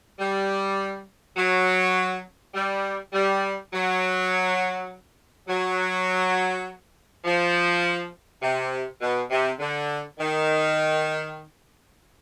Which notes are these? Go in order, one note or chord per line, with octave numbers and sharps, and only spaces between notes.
G3
F#3
G3
G3
F#3
F#3
F3
C3
B2
C3
D3
D#3